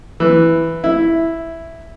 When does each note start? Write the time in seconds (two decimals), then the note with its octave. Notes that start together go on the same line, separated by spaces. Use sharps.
0.20 E3
0.84 E4